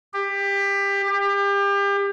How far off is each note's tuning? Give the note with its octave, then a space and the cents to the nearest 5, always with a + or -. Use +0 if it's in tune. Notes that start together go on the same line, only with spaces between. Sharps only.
G4 +20
G4 +30